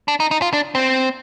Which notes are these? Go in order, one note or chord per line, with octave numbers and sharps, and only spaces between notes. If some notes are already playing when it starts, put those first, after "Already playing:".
D4
D#4
D#4
F4
D4
C4